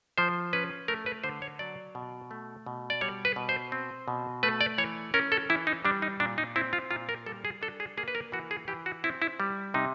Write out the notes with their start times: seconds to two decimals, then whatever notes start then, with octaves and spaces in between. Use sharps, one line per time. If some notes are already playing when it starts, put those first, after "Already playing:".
0.18 F3 C5
0.53 C#4 B4
0.88 A3 A#4
1.06 B4
1.24 D3 C5
1.42 C#5
1.59 F#3 D5
1.95 B2
2.31 A3
2.66 B2
2.90 D5
3.01 G3 C#5
3.25 B4
3.36 B2
3.49 C5
3.72 C4
4.08 B2
4.43 A3 B4
4.61 D5
4.78 E3 C#5
5.14 C#4 A#4
5.32 A4
5.50 E3 E4
5.67 D#4
5.85 G3 D4
6.02 D#4
6.20 A#2 D4
6.38 D#4
6.56 C4 E4
6.73 F4
6.91 A#2 F4
7.09 A#4
7.26 G3 A4
7.45 G#4
7.62 D4 A4
7.80 G#4
7.97 A#3 G#4
8.08 B4
8.15 A#4
8.32 E3 F#4
8.51 G#4
8.68 E3 G4
8.86 F#4
9.04 C4 E4
9.22 E4
9.40 G3
9.74 C3 D#4